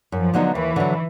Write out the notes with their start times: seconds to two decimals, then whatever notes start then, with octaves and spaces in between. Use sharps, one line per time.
0.12 F#2 F3
0.34 D3 F#3 B3 D#4
0.54 D#2 E3
0.76 D3 F#3